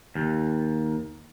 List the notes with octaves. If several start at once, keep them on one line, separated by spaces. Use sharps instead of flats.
D#2